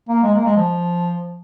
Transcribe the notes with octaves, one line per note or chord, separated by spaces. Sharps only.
A#3
G#3
A#3
G#3
F3